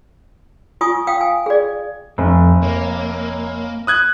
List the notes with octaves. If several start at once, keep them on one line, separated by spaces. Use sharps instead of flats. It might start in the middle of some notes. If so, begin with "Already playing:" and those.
F4 G#5 C#6 D#6
F5 G5 D#6
G#5
G#4 D5
F1 F2
A#3 C#5
D#6 F#6 G#6